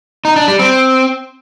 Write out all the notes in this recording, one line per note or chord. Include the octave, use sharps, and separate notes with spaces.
D#4
D4
G3
C4